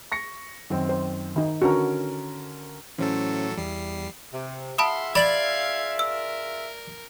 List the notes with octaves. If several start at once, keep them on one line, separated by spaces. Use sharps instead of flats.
C#6 A#6 C#7
F#2 D#3 C4
C5
D#3 D#4
D3 C#4 F#4 A#4
A2 E3 F#3 C#4 A4 C5
E2 G3 C7
C3
F4 G#4 E5 F#5 A5 B5 C6 D#6
D5 F5 B5 G#6 A6 F#7
A#4 E6